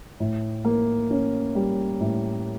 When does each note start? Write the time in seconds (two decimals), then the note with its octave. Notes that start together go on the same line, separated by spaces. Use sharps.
0.20 A2
0.65 A#3
1.10 C#4
1.55 G3
2.01 A2